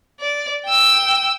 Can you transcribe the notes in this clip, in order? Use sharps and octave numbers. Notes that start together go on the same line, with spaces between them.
D5
G5 E6